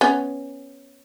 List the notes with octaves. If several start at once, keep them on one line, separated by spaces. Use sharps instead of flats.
B3 C#4